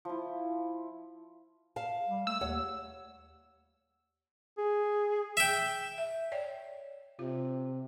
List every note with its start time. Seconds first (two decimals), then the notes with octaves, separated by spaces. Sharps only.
0.05 F3 E4
1.76 E5 F5 A5
2.08 G3
2.27 A3 E6
2.41 D#2 C#5 F#5
4.58 G#4
5.37 E5 G5
5.98 E5
6.32 C#5 D5 G5
7.19 C3 F4